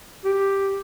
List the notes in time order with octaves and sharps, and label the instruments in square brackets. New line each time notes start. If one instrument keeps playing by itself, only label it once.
[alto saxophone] G4